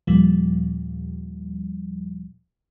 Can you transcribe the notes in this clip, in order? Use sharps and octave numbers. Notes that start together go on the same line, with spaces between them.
D#2 A#2 F3 G3